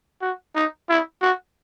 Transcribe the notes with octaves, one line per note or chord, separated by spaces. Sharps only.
F#4
D#4
E4
F#4